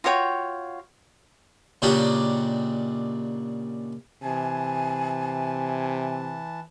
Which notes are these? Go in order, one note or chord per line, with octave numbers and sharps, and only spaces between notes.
F4 F#4 C#5 G5
A#2 C#3 D4 D#4 F#4 G4
C3 E3 G#5 A5